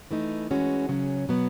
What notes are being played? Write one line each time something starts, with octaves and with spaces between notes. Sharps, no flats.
E3 A3 D#4
E3 G#3 C#4 F#4
C#3 F#3 C#4
B2 F#3 B3